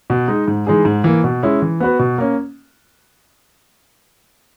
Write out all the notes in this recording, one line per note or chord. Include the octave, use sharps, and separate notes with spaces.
B2
G#3 D#4
G#2
E3 G#3 D#4 G#4
G#2
E3 A#3
B2
G#3 C#4 E4
E3
B3 F#4 B4
B2
A#3 C#4